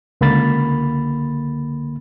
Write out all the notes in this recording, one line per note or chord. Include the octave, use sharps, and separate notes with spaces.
C#2 D3 A#3 B5 A6